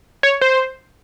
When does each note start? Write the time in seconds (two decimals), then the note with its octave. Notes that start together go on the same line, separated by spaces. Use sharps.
0.23 C#5
0.41 C5